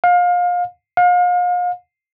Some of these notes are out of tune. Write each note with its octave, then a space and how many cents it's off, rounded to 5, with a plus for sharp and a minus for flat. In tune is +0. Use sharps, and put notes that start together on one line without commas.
F5 +30
F5 +40